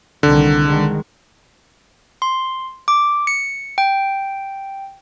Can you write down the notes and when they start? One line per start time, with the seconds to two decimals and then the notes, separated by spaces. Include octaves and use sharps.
0.23 C2 D3 D#3
0.66 D#3 G#3
2.22 C6
2.88 D6
3.27 C#7
3.78 G5